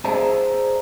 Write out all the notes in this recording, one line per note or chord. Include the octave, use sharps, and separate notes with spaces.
G#4 C5 D5 E5 A5 A#5